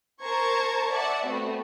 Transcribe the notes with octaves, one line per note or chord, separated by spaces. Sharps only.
A#4 C5 A5 A#5 C#6 G#6
D5 E5 F#5 A5
A3 B3 C4 F#4